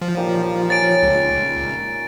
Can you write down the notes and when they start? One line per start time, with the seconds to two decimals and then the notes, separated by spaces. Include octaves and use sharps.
0.01 F3
0.17 A#2 D#4 G4
0.70 C#5 G#5 A6 D7
1.02 C#2